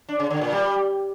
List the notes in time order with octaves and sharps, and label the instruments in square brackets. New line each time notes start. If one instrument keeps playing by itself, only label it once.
[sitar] D4
C#3
D3
A#2
G3